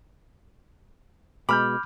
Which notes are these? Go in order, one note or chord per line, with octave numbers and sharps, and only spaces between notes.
B2 G#3 B5 D6 F6 G6